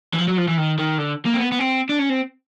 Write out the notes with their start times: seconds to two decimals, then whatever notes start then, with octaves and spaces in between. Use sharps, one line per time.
0.13 E3
0.18 F3
0.28 F#3
0.38 F3
0.48 E3
0.58 D#3
0.78 D#3
0.98 D3
1.25 A#3
1.34 C4
1.39 B3
1.52 B3
1.59 C4
1.89 D4
1.99 C#4
2.10 C4